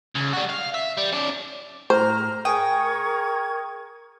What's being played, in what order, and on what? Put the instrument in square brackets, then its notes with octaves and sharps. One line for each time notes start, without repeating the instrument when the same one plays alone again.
[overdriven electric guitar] C#2
G3 F#4
F5
E5
G3
C#4 D5
[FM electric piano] A2 [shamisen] C5 [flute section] A#5 F6
[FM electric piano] G#4 D#6 [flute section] A#4 C#6 G#6 [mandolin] G5